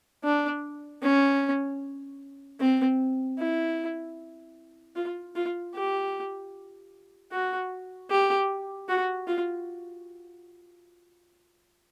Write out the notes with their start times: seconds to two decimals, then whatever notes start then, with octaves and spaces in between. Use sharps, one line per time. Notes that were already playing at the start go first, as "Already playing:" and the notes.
0.25 D4
1.03 C#4
2.60 C4
3.39 E4
4.96 F4
5.36 F4
5.75 G4
7.32 F#4
8.11 G4
8.89 F#4
9.28 F4